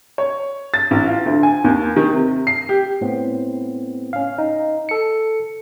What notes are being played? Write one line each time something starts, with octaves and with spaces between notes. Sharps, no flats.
C#5
A6
A1
F4
D2
G#5
D#2
D#3
C3
C7
G4
A2 B3 C4
C#4 F5
D#4
A4 C#7